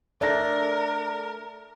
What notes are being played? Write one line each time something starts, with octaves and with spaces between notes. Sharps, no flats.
A3 D4 A4 A#4 D5 A#6